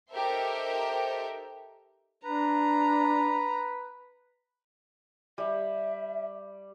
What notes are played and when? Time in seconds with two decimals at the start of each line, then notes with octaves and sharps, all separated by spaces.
0.11 D#4 G4 A4 A#4 C5 E5
2.25 D4 B4 A#5
5.38 G3 E5